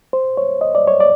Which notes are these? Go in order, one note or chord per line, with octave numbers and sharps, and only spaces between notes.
C5
C#5
D#5
D5
C#5
D5